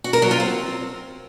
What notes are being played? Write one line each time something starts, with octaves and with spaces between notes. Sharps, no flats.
F#4
A#4
F#3
F4
C4